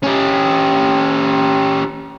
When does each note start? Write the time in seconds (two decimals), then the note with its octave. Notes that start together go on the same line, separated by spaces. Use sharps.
0.03 C#4 G4